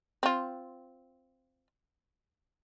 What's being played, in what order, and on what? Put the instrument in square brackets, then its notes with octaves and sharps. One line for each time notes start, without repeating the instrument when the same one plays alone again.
[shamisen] C4 F4